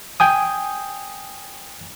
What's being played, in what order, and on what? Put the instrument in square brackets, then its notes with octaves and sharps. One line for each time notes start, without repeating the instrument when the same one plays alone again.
[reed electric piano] G5 G#5 D#6